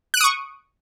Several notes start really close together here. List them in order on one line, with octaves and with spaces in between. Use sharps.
F#6 D7 D#6 C#6